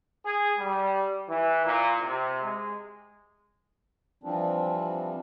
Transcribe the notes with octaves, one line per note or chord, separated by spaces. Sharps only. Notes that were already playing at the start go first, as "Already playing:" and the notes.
G#4
G3
E3
A#2
C3
G#3
E3 F3 G3 C4 D4